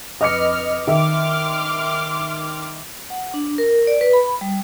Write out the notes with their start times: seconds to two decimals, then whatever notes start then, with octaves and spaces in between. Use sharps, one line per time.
0.21 F2 B4 D#5 D6 F6 C#7
0.87 D#3 E5 C6 D6 F6
3.10 F#5
3.34 D4
3.58 A#4
3.87 D5
4.01 B4
4.13 B5
4.41 G3